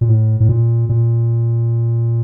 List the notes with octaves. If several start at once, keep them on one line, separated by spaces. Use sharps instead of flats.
A#2
A2
A2
A#2
A#2